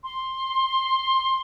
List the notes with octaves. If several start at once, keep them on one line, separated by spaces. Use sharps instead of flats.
C6